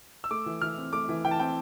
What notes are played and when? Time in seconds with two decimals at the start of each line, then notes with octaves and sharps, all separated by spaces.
0.24 E6
0.31 A3 D6
0.46 E3
0.62 E3 F6
0.78 C4
0.93 A3 D6
1.09 E3
1.24 E3 G5
1.31 A5
1.40 C4 G5